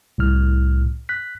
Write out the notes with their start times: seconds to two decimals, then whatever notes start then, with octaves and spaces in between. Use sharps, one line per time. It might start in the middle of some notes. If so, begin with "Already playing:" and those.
0.18 C2 A2 F6
1.09 F#6 B6